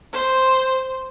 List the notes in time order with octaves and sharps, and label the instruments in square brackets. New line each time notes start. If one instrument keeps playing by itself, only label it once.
[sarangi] C5